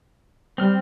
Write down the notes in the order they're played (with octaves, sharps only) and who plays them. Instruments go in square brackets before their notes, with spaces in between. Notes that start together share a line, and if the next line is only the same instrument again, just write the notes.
[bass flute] G3 [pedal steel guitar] C4 F6